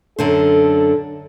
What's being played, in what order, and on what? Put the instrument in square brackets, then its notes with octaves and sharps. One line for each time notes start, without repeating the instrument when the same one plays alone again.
[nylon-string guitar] F#2 D3 C5 [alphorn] A4